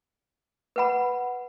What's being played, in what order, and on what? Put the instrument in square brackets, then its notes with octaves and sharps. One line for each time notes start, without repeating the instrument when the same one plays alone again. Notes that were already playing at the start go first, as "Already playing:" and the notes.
[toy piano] B4 F#5 B5